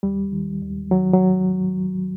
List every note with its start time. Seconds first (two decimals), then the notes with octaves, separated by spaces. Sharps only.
0.03 D#2 G3
0.32 D#3
0.62 D#2
0.91 D#3 F#3
1.13 F#3